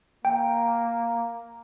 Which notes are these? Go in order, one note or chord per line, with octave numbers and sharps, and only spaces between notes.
A#3 G5